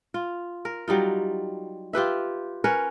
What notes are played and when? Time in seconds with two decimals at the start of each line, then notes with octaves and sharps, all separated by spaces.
0.14 F4
0.65 A#4
0.88 F#3 G3 D#4 F4
1.93 F4 G4 B4 E5
2.64 C#4 A#4 B4 C#5